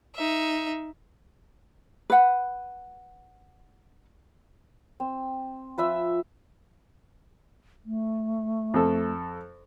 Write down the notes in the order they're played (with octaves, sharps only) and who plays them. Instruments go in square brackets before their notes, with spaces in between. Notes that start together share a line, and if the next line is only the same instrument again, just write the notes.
[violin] D#4 E5
[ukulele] B4 F#5
[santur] C4
F3 B4 E5 E6
[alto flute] A3
[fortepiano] F2 A4